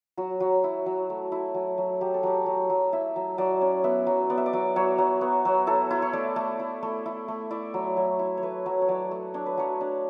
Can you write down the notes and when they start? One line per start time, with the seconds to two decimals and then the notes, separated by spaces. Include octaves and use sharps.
0.17 F#3 F#4
0.40 F#3
0.64 E4
0.86 F#3
1.10 A3
1.32 E4
1.54 F#3
1.78 F#3
2.01 F#3 G4
2.14 A4
2.23 F#3 G4
2.46 F#3
2.70 F#3
2.93 E4 E5
3.16 F#3
3.38 F#3 D5
3.61 C#4
3.84 B3 E5
4.07 F#3
4.30 B3 D5
4.38 E5
4.46 D5
4.53 F#3
4.76 F#3 C#5
4.98 F#3
5.21 B3
5.45 F#3
5.67 E4 A4
5.91 E4
6.02 C#5
6.13 A3 D5
6.36 A3
6.59 E4
6.83 A3
7.06 E4
7.28 A3
7.51 E4 D5
7.74 F#3
7.97 F#3 C#5
8.19 E4
8.37 C#5
8.43 A3 B4
8.66 F#3
8.82 C#5
8.88 F#3 D5
9.11 A3
9.34 D4 C#5
9.46 B4
9.57 F#3 C#5
9.81 D4